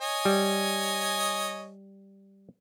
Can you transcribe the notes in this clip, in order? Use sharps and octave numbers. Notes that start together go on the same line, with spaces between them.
C#5 D#5 G#5
G3